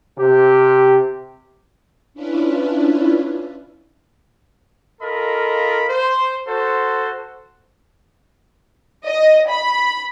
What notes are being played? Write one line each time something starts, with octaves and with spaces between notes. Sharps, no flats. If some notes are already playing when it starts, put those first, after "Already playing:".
C3 G4
C#4 D4 E4 F4 B4
F4 A4 A#4 D#5 B5
C5
F#4 A4 C5
D#5
B5